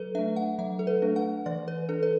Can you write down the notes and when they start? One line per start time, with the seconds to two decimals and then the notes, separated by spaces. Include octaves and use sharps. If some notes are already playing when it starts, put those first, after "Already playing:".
Already playing: F#3 A4 B4
0.15 A3 D4 E5
0.36 F#5
0.59 F#3 E5
0.79 A4
0.87 B4
1.02 A3 D4
1.16 F#5
1.46 E3 D5
1.68 B4
1.89 D4 A4
2.03 B4